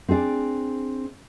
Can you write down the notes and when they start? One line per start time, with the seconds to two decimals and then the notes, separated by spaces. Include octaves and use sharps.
0.09 C4 D4 G#4 D5